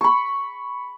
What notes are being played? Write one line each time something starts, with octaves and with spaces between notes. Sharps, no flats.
B5 C#6